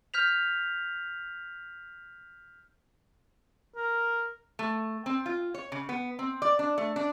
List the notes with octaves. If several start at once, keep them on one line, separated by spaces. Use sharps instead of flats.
F6 G6 B6 F7
A#4
A3
C4
F4
C#5
C#3
B3
C4
D5
D4
A3
D4